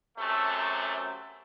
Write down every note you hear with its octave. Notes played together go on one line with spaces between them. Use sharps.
F#2 C3 A3